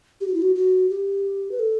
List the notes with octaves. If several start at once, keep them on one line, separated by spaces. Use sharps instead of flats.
G4
F#4
E4
F#4
F#4
G4
B4
A4